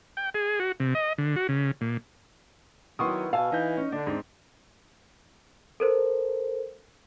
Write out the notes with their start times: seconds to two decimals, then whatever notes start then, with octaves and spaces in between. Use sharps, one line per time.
0.17 G5
0.34 G#4
0.60 F#4
0.80 C3
0.95 D#5
1.18 D3
1.36 F#4
1.49 C#3
1.81 A#2
2.99 D#3 F#3 B3 E4 C6 C#6 D#6
3.33 B2 F5 G#5 A5 E6
3.52 E3 D#4 G6
3.77 C#4
3.92 D3 D4
4.07 G#2 C4
5.80 A4 A#4 C5